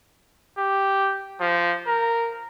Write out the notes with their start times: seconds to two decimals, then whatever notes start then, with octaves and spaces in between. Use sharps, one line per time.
0.58 G4
1.41 F3
1.87 A#4